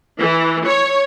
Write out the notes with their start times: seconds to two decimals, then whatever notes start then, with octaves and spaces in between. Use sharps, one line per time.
0.20 E3
0.66 C#5